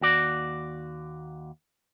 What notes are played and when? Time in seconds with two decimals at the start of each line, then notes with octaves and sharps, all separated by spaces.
0.01 D#2 F#4 D5